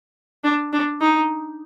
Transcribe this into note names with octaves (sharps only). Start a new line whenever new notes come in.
D4
D4
D#4